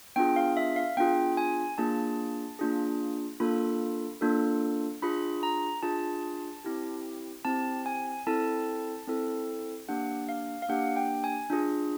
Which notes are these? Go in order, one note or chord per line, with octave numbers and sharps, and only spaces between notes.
B3 D4 F4 G#4 G5
F5
E5
F5
B3 D4 F4 G#4 G5
G#5
A#3 D4 F4 G#4 A5
A#3 D4 F4 G#4
A#3 D4 F4 A4 B5
A#3 D4 F4 A4
D4 F4 G#4 B5
A#5
D4 F4 G#4 A5
C4 E4 G4
C4 E4 G4 A5
G#5
C4 E4 A4 A5
C4 E4 A4
A#3 D4 G4 F#5
F5
F5
A#3 D4 G4 F#5
G5
G#5
D4 F4 G#4